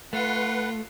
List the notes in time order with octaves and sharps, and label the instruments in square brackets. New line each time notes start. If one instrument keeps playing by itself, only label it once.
[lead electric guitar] A3 [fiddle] F4 [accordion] B4 F#5